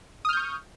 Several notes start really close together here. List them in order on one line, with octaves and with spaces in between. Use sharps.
D#6 F6 G6 C#6